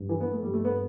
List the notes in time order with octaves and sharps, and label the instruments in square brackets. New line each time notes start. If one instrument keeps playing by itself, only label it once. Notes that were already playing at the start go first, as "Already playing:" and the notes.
Already playing: [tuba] G2
[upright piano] E3
B3
A3
[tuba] G2 [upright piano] G3
[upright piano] A3
B3